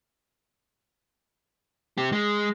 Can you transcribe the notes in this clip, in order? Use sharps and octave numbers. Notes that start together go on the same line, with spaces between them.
C4 G4
G#3